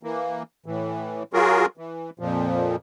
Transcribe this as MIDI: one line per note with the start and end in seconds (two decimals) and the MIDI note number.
0.03 0.43 52
0.03 0.43 58
0.66 1.23 45
0.66 1.23 52
1.33 1.66 54
1.33 1.66 65
1.33 1.66 66
1.33 1.66 68
1.33 1.66 70
1.77 2.10 52
2.19 2.76 41
2.19 2.76 46
2.19 2.76 53